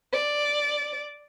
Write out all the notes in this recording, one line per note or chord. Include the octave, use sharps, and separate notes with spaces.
D5